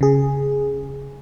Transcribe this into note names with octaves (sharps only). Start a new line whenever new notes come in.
C#3 G#4